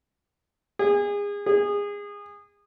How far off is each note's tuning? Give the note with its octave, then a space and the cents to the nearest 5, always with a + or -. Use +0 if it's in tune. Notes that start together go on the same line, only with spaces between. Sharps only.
G#4 -30
G#4 -25